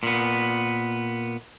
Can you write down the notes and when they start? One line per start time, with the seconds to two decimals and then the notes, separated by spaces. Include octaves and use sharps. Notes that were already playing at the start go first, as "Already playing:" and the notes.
0.03 A#2 B3